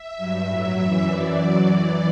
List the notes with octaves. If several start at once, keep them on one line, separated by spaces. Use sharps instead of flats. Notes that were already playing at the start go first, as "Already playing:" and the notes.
Already playing: E5
G2 F#3
A2 F#3
F#2 E3 E5
F#2 E3 D5
F#2 F#3
F#2 E3